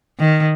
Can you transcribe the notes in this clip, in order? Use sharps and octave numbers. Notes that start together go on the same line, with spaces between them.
D#3